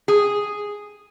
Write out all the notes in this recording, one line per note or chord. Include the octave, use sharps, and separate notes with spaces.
G#4